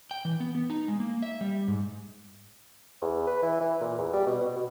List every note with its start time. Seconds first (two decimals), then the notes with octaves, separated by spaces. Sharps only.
0.11 G5
0.25 E3
0.40 B3
0.55 B3
0.70 D#4
0.88 G#3
1.00 A#3
1.22 E5
1.41 G3
1.68 G#2
3.02 E2
3.27 B4
3.43 E3
3.61 E3
3.81 A#2
3.99 E2
4.13 G3
4.27 B2
4.41 B2
4.56 B2